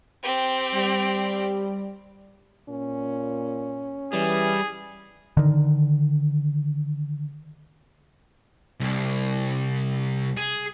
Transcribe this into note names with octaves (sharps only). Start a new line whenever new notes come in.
C4 G4
G3
A#2 C#4
E3 G3 G#4
D3 D#3
C2
G#4